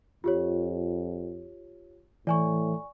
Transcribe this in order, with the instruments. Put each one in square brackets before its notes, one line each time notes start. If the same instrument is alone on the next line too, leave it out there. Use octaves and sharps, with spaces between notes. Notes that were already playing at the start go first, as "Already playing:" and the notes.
[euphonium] F2 [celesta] F4 G4 C#5
[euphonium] A2 [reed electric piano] E3 [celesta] D5 G#5 C#6